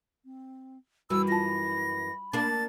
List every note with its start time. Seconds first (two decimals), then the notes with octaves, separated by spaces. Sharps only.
0.25 C4
1.10 F#2 E3 G3 F#4 B5 E6
1.28 F4 A5 A#6
2.33 A#3 D4 A6